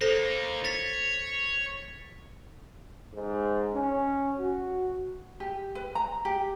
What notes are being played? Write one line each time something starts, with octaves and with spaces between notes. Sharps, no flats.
A#3 D#4 A4 C5 A#6 C7 E7
C#5 A6 B6
G#2
C#4
F#4
G4
B4
A#5
G4